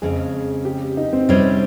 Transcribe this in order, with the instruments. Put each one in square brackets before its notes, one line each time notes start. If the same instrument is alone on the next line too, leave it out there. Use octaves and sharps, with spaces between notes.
[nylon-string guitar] F2 C#3 G#3 [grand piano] G#4
[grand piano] G4
D#4
C4
[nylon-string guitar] C3 G3 C#4 G#4 C5